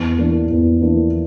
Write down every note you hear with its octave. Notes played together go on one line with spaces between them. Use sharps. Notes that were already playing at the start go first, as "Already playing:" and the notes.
Already playing: E2
E3 A#3 D4
E2
E3 A#3 D4